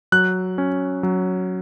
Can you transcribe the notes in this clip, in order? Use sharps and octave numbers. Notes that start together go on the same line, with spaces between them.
F#3 F#6
C#4
F#3